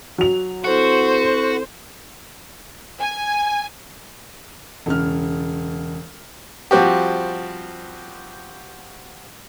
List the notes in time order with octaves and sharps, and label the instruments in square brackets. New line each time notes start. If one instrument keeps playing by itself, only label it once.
[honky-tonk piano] F#3 F7
[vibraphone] C4 E4 A4 [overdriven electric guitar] F#4 [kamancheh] C5
[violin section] G#5
[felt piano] E1 C#3 F6
[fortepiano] F3 G3 C4 F#4 G4